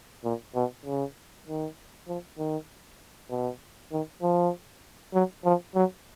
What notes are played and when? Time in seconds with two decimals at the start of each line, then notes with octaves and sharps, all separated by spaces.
0.24 A#2
0.55 B2
0.86 C#3
1.48 D#3
2.08 F3
2.38 D#3
3.30 B2
3.92 D#3
4.22 F3
5.13 F#3
5.45 F3
5.75 F#3